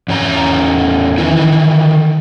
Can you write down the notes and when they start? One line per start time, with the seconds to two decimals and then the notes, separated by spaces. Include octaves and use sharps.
0.08 E2 C#4 A#5
1.18 D#3 E3 E4